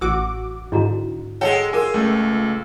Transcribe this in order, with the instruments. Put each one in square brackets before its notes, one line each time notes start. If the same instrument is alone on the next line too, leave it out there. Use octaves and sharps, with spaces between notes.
[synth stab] A1 F#4 D6 [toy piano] E6
[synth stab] G#2 D3 [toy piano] E4 F#4 A#5
[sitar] G#3 A4 [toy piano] C#5 F#5 G5
[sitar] F4 [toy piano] G#4 A#4 [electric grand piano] G#5 E6
[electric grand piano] C#2 A3